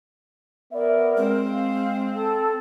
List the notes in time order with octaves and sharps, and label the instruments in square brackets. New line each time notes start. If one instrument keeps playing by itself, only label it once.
[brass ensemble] B3 D5 E5 [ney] A#4
[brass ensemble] G#3 [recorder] C4
[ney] F5
A4